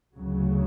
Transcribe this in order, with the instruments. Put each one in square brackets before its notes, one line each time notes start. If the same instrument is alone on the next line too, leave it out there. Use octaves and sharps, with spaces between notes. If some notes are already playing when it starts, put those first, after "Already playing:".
[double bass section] D2 C#3 F#3